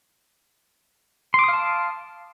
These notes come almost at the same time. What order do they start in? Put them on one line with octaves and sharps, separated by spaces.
C6 D6 D#6 F5 A5